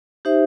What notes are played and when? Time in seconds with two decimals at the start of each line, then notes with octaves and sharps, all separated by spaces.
0.25 D#4 G4 C5 E5